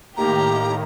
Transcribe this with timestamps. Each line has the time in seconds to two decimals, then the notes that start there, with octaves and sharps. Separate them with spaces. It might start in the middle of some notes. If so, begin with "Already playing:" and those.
0.17 A2 D#3 A#3 G4 A#5